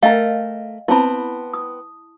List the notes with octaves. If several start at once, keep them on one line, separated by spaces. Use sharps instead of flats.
A3 A#4 D#5 F5 G5
B3 C4 E4 A5 B5
D#6